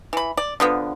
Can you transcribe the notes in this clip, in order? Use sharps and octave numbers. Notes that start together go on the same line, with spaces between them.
E3 B5
D5
D3 F3 B3